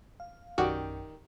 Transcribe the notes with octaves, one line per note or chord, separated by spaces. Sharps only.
F5
A#1 F#2 D#3 C#4 F#4 G4 D5